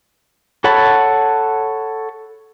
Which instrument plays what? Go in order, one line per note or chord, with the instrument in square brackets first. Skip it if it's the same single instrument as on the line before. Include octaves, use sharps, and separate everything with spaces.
[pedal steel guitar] A4 C#5 F#5 A5 B5